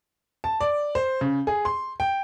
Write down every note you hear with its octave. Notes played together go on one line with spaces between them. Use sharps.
A5
D5
C5
C#3
G#4
C6
G5